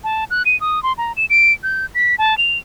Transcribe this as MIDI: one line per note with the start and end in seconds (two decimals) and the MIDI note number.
0.04 0.24 81
0.31 0.43 90
0.46 0.59 99
0.61 0.82 87
0.83 0.93 84
0.98 1.12 82
1.17 1.25 100
1.30 1.53 98
1.63 1.86 91
1.95 2.15 95
2.18 2.37 81
2.38 2.58 101